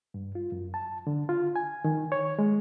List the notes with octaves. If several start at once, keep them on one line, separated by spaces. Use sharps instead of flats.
G2
F4
F#2
A5
D3
F4
G#5
D#3
C#5
G#3